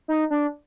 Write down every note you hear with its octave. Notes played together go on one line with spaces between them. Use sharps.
D#4
D4